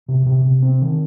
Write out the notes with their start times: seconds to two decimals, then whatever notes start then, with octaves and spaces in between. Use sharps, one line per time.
0.08 C3
0.26 C3
0.45 C3
0.62 C4
0.81 D#3